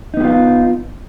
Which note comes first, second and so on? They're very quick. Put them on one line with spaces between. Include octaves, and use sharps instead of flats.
D#4 B3 G4 F4